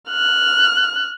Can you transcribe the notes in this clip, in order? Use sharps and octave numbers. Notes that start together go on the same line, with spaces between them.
F6 F#6